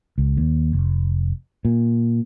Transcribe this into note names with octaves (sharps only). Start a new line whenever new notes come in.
C#2
D#2
F1
A#2